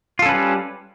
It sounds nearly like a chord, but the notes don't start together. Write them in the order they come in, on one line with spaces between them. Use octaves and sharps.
F4 A4 C#4 B4 G3